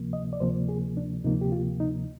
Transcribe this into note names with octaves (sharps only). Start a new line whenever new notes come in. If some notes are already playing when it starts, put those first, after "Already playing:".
Already playing: D2 C3 F3 A#3
D#5
D5
D2 C3 F3 A#3 C5
G#4
D4
D2 C3 F3 A#3 D#4
G4
F4
D#4